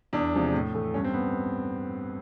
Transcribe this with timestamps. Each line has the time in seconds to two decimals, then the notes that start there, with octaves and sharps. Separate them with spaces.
0.13 E2 D4
0.33 C3 F3 G#3
0.54 A2
0.74 E3 A3
0.94 G2 C#4
1.04 C4
1.14 B3